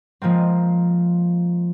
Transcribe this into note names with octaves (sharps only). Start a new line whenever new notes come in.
F3 G#3 A#3 C4